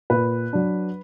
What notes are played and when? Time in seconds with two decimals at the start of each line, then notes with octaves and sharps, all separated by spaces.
0.10 A#2 B4
0.53 F#3 D4